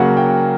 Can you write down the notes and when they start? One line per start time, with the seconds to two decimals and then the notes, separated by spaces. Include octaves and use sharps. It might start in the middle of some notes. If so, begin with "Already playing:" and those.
Already playing: C#3 F#3 A#3 F#5
0.17 G5